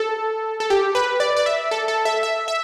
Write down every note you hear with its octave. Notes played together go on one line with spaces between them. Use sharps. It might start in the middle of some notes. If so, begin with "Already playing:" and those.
Already playing: A4
A4
G4
B4
D5
D5
E5
A4
A4
E5
E5
E5